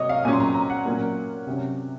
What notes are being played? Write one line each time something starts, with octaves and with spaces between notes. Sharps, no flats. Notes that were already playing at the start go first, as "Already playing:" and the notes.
Already playing: C3 F#3 A#3 C#5 D#5
F5
A#2 F#3 C#4 G#5
C6
A#5
A#5
F#5
A#2 F#3 A#3 C#4
C3 F#3 C#4